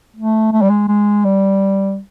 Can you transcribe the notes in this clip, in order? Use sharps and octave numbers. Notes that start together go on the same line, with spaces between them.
A3
A3
G3
G#3
G#3
G3